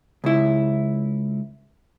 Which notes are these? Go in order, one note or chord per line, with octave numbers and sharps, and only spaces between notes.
C#2 E4